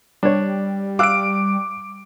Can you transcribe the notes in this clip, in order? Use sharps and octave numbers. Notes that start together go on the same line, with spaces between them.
G3 D4 C#5
F5 D6 E6 F#6 D7